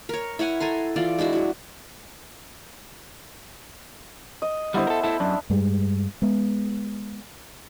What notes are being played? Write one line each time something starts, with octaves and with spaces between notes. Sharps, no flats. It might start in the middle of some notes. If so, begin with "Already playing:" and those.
A#4 C#5
E4 C#5 F#5 G#5
A4 G#5 A#5 C6
E3 F4 D5 C6
G#3 D4 E4 F#4
F#3 E4
D#5
D3 G3 B3 E4 C5
A4 A#4
E4 A4 E5
F#2 D4
G2 G3 G#3
G#3 B3